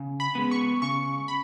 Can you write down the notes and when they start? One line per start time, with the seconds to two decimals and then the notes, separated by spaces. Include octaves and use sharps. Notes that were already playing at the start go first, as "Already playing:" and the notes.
Already playing: C#3
0.20 B5
0.35 G#3 B3
0.51 C#6
0.82 C#3 C#6
1.28 B5